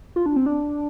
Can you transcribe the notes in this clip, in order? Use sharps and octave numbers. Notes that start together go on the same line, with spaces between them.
F4
D4
C4
D4